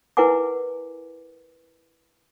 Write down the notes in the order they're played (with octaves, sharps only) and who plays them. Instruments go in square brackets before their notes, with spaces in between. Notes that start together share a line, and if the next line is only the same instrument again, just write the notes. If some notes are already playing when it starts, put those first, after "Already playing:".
[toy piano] E4 A#4 B4 F#5 G#5 D6